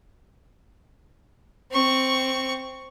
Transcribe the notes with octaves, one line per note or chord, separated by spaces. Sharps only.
C4 C#6